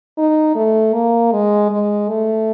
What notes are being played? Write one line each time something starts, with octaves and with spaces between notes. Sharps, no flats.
D#4
A3
A#3
G#3
G#3
A3